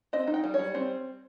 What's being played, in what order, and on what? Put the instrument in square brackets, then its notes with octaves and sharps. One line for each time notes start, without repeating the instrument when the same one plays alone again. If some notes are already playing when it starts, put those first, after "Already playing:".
[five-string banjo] C4 D#5
D#4
G5
G3
C#5
G3
C4